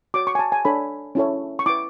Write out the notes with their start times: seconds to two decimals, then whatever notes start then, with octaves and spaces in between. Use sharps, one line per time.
0.14 F#4 C#5 D6
0.27 C#6
0.35 G#5
0.39 A5
0.52 G#5
0.65 D4 A4 C#5 B5
1.15 C#4 E4 A4 C#5
1.59 C#6
1.66 E4 B4 D6